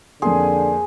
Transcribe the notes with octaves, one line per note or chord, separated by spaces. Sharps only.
F2 D3 A#3 G#4 C6